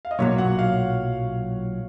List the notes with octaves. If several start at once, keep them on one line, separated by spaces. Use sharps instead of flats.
F5
D#5
B1 A#2 F#3 C#5
F#5
F5